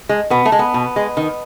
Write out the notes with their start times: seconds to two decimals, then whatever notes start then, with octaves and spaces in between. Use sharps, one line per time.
0.09 G#3
0.30 B2 B3
0.45 A3
0.52 G#3
0.59 B3
0.74 B2
0.96 G#3
1.17 D#3